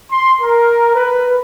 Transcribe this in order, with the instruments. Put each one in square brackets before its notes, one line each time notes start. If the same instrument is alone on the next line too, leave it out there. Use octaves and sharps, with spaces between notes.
[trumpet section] C6
A#4
B4